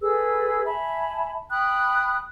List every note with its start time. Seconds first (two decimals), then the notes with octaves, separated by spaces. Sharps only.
0.02 G#4 A4 B4 E6
0.65 E5 G#5 A5 B5
1.50 G5 B5 D#6 F#6